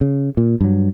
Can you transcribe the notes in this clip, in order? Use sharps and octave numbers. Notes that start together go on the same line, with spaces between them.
C#3
A#2
G2 F#3